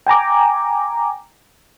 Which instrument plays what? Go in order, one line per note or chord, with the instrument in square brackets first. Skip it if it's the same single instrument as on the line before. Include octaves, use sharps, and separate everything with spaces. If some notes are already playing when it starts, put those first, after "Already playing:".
[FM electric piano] G5 G#5 A#5 D6